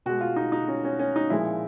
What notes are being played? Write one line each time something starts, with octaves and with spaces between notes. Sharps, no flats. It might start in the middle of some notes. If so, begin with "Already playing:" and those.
B2 G#3 F#4
F4
D#4
D#4
C#4
C#4
C#4
D#4
A#2 F3 G#3 E4